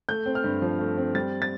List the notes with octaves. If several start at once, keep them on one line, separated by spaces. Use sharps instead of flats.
A3 G6
C4
F6
G2
F3
A3
C4
G3 A6
A6